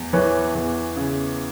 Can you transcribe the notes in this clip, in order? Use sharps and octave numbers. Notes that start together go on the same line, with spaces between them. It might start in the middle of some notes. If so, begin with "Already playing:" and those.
Already playing: E2
E3 B4 C#5
E2
C#3